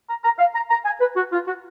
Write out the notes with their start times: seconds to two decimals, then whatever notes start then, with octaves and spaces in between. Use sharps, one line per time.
0.09 A#5
0.25 A#5
0.39 F5
0.55 A#5
0.71 A#5
0.85 G#5
1.01 B4
1.16 F#4
1.33 F4
1.47 F#4